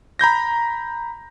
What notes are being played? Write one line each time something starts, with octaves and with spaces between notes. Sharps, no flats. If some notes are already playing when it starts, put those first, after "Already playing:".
A#5 B5 G6 A#6